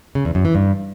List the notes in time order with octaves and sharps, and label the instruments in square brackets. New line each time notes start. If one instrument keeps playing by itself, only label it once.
[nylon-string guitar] C#3
E2
F#2
E3
G2